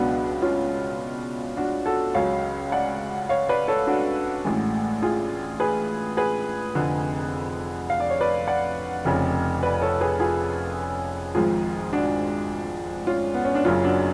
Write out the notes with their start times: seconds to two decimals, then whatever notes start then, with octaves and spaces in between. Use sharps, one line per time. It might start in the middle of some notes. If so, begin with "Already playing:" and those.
Already playing: C#2 B2 F#3 B3 D4
0.42 C#4 F4
1.57 D4 F#4
1.86 F#4 A4
2.15 C#2 C#3 F#3 C#5 F5
2.72 D5 F#5
3.29 C#5 F5
3.49 B4 D5
3.68 A4 C#5
3.87 D4 F#4
4.45 A1 A2 G#3
5.02 F4 G#4
5.60 G#4 B4
6.17 G#4 B4
6.75 F1 F2 D3
7.90 F5
8.00 D5
8.10 C#5
8.21 B4 D5
8.48 D5 F#5
9.05 F1 F2 C#3
9.63 B4 D5
9.82 A4 C#5
10.01 G#4 B4
10.20 F4 G#4
11.35 G#1 G#2 F3 G#3 F4 G#4
11.93 D4 F#4
13.07 C#4 F4
13.34 B3
13.45 C#4
13.55 D4
13.65 F#1 F#2 C#3 C#4 F4
13.84 D4 F#4